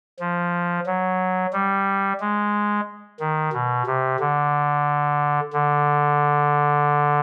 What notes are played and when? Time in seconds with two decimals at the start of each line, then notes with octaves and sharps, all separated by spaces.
0.20 F3
0.86 F#3
1.53 G3
2.20 G#3
3.20 D#3
3.53 B2
3.86 C3
4.20 D3
5.53 D3